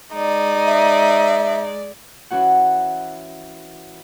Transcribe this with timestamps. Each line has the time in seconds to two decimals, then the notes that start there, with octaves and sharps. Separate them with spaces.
0.14 G#3 D#4 D5
0.66 E5
2.31 E3 C#4 F#4 F#5